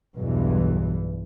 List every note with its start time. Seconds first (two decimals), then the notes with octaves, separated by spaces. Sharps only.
0.17 B1 E2 G2 E3